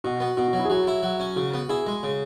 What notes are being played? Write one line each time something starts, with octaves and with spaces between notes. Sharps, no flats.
B2 F#4
B3
B2 F#4
F#4
F#3
E4
G#4
F#3 F#4
E4
F#3
C#4
C#3 F#4
B3
E4 G#4
G#3
C#3